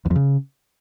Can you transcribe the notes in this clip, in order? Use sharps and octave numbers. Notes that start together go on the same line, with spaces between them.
E2
F2
C#3